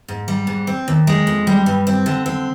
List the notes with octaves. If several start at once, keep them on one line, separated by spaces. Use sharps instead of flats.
G#2
G3
G#2
C4
D#2
G#3
F2
G3
G2
C4
D3
C4